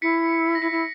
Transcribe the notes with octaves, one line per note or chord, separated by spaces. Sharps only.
E4 B6 C#7
A#6
E4 B6
E4